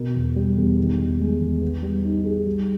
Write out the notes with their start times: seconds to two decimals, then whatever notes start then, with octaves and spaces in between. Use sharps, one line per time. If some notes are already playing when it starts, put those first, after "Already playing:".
Already playing: B2 A#4
0.15 E2
0.36 G3
0.57 E2
0.78 D#3
0.99 E2
1.20 G#3
1.40 E2
1.61 B3
1.83 G3
2.05 D#4
2.25 G#4
2.46 G3